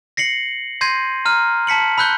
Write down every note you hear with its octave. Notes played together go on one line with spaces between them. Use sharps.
A#6 C7 C#7 F#7
C6 G6 G#6 A#6 C7 D#7
A#5 F6 D#7
A5 B6 C#7 F#7
B5 E6 F#6 G6 G7